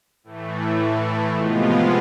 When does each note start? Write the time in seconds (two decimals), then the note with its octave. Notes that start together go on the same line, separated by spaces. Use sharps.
0.24 A2 E3 A3
1.34 C3 F3 G#3 B3 F4